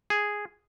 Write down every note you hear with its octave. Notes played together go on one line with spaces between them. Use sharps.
G#4